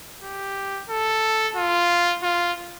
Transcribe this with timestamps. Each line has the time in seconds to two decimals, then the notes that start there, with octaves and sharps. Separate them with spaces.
0.22 G4
0.89 A4
1.56 F4
2.23 F4